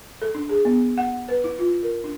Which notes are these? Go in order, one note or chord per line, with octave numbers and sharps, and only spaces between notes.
A4
D4
G#4
B3
F#5
B4
E4
F4
A#4
D4